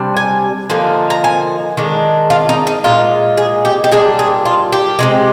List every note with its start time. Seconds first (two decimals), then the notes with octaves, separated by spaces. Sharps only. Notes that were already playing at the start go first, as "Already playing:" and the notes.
Already playing: C3 G3 D4
0.17 G#5
0.70 D3 F3 A#3 D#4
1.10 A#5
1.24 G#5
1.77 D#3 G#3 D4
2.30 F4
2.49 D#4
2.67 D#4
2.84 A#2 G#3 D#4 F4
3.37 G#4
3.65 G4
3.84 G4
3.91 A#2 G3 D4 G#4
4.19 G#4
4.45 F4
4.72 G4
4.99 C3 D#3 G#3